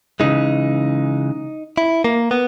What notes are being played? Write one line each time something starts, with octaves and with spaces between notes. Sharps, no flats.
C#3 E3 G#3 D#4
E4
A#3
B3